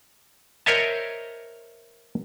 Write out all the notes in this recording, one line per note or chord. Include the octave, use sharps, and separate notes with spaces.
A#4 C5 C#5 D#5 E5 A5